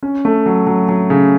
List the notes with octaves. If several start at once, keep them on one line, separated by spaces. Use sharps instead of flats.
C#4
A3
F#3
F#3
F#3
C#3